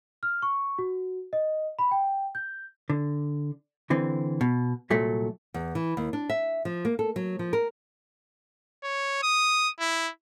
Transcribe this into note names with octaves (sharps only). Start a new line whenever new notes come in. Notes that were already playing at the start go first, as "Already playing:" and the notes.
F6
C#6
F#4
D#5
B5
G5
G6
D3
D3 E3 C4
B2
C2 A#2 F#3 A3
E2
E3
D#2
D4
E5
F3
A#3
A4
F#3
F3
A#4
C#5
D#6
E4